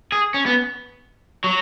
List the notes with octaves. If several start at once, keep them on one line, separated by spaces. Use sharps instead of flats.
G#4
C#4
B3
F#3